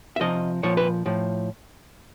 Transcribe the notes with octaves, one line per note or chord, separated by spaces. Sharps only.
E5
C3 F3 D#5
A#2 F3 C#5
B4
A2 F3